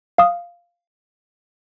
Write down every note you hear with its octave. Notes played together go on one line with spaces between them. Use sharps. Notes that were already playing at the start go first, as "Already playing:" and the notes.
F5 D#6